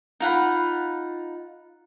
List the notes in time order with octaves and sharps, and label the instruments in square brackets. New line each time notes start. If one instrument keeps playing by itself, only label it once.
[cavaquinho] D#4 F4 F#5 B5